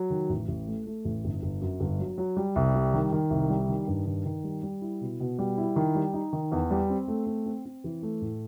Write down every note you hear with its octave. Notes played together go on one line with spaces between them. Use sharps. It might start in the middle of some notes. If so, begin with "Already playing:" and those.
Already playing: F#3
D#3
A1
A1
A3
A3
A1
G1
G1
F#2
G1
F#3
F#3
G3
C2
G3
D#3
D#3
C2
G3
D#3
G2
D#3
D#3
G3
G3
E4
B2
B2
G3
E4
D#3
G3
D#4
D#3
E2
G3
C4
A3
C4
C4
C4
E3
A3
A2